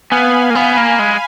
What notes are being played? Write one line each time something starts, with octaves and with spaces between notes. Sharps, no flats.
B3 F5 G#5
A#3
B3 G#5 B5
A#3
G#3